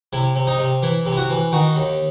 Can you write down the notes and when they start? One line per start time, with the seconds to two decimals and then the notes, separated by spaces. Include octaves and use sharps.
0.13 C3 E4
0.36 C3
0.47 D#4
0.59 C3
0.82 E3 E4
1.06 C3
1.12 E4
1.17 F#4
1.30 E3
1.52 D#3 F#4
1.76 D#2